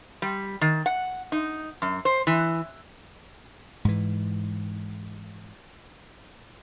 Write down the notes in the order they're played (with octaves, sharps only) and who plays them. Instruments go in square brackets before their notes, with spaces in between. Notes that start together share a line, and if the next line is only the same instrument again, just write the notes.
[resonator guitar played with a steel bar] G3
D#3
F#5
D#4
F#2
C5
E3
[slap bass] G#2 E3